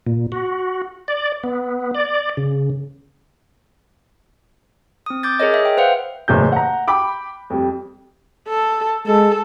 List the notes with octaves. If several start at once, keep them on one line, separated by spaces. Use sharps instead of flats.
A#2
F#4
D5
B3
D5
C#3
C4 D#6
D6 G6 A6
G#4 A#4 C#5 D#5
E5
G5
B4 C5 F5 F#5
F#1 E2 A2 G6
F#5 A#5
G5 B5 D6
F2 G3
A4
G#3 A4